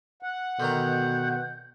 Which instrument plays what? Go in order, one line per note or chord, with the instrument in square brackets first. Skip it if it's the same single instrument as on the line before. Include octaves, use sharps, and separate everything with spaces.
[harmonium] F#5
[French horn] B2 [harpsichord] D3 D#3 A#5 [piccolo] G6